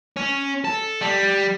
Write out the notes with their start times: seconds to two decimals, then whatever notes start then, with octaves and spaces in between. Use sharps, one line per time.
0.16 C#4
0.65 A4
1.01 G3